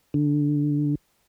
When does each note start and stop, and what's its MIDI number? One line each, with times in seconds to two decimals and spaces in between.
0.14 0.95 50